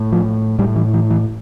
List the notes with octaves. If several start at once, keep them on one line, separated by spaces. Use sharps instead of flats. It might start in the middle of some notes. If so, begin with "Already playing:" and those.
Already playing: A2
F3
A2 G3
E3
E3
E3